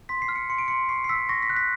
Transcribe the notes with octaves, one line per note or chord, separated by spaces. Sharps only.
C6 B6
C7
F6
C#7
C6 C#7
D7
C6 C#7
C#6 C7
C7
E6 B6
C#6 A#6
B6
F#6
B6